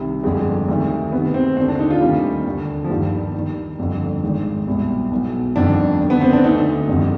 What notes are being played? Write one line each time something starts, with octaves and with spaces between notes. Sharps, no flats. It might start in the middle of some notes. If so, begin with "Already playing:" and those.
Already playing: C2 C3 D#3
G1 F2 D3 G#3
D2 C3 D#3
D2 C3 D#3 B3
C4
D#2 D3 C4
D4
D#4
F4
D2 C3 D#3 G3
D#2 D3
F3
G1 G2 D#3 G3
D#2 D#3
G1 F2 D3
G#1 G#2 D#3
C2 B2
B1 B2
G1 F2 D#3 D4
D#2 D3
B3
C4
D4
D2 D3 D#4
G1 F2 C3 D#3